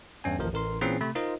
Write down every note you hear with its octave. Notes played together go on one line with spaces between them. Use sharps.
E2 G2 C#4 G#5
A1 D#2 F3 A#4
A1 A#4 C6
A#2 E3 C4 C#4 G#4 C7
C3 A3 B5
D#4 F4 A#4 C5 D#5